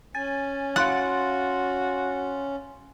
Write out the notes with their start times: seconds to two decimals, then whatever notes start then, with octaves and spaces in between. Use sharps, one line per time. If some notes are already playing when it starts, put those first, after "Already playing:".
0.15 C#4 G#5 A6
0.76 F#4 F5 F#5 C6 A6